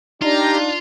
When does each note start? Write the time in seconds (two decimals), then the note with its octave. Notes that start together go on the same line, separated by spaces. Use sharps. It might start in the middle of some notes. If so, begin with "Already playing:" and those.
0.22 D4 D#4 F4 G4 A#5